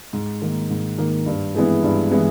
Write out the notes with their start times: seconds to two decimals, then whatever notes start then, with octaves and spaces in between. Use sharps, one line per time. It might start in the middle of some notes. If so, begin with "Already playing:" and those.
0.13 G#2
0.42 D#3 A#3
0.70 G#2
0.98 D#3 A#3
1.26 G2
1.55 E3 G#3 B3 E4
1.83 G2
2.11 E3 G#3 B3 E4